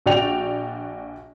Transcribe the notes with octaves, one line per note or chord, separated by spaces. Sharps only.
A#1 F#4 D5 G5 F7